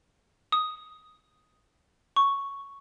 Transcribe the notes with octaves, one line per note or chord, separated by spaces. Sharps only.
D#6
C#6